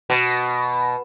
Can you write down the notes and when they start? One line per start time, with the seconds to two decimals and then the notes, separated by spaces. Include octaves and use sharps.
0.10 B2